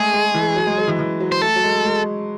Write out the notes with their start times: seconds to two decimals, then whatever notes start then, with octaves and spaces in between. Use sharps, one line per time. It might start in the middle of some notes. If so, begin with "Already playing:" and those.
Already playing: G#3 A3 G#4
0.13 G#3
0.34 E3
0.56 F#3
0.67 G#3
0.77 F#3
0.88 E3
0.99 E3
1.20 F#3
1.32 C5
1.42 A3 A4
1.56 F#3
1.63 G#3
1.85 G#3